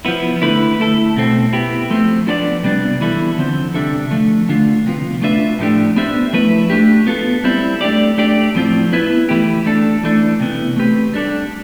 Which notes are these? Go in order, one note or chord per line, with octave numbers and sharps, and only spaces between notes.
F3 B3 E4
D3 A3 E4 B4
A3 E4 A4
B2 A3 C4
B3 E4 G4
F3 A3 C4
F3 B3 D4 A4 D5
C3 G3 B3 D4
E3 G3 B3 E4 A4
D3 F3 C4
C3 G3 D4 A4 E5
D3 F3 A3
D3 A3 D4 F4
C3 F3 B3 F4
A3 D4 F4 B4 E5
A2 F3 A3 D4 G4
B3 D4 G4 C5 E5
F3 A3 E4 B4
A3 D4 G4
B3 F4 A4
G3 C4 E4
A3 D4 G4 D5
A3 D4 G4 D5
A2 F3 C4 F4
B3 E4 B4 E5
E3 A3 E4 G4
A3 D4 A4
E3 A3 D4
C3 E3 B3
A3 C4 G4 B4
G3 D4 A4 D5